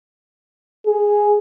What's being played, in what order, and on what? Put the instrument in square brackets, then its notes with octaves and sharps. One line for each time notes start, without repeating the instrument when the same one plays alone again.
[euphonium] G#4